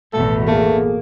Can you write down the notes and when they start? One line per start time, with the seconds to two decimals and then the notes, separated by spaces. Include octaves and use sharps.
0.13 A1 E2 B2 A3 A4
0.47 A3 A#3 G#4 A4